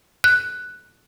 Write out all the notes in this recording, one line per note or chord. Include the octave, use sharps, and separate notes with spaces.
F#6